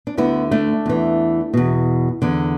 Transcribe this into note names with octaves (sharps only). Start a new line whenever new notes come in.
D4
D2 D3 B3 E4
A3 D4
E2 E3
E2 B2
E2 D3